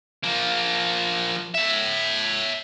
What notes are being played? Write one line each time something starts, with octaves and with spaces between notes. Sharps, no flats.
F3 A#3
C#5 E5